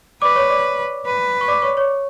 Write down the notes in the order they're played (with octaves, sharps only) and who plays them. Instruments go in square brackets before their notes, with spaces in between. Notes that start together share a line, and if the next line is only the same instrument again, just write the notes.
[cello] B4 [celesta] D5 D6
[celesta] C#5 C#6
D5 D6
[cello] B4
[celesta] C#6
D5 D6
C#5 C#6
C#5 C#6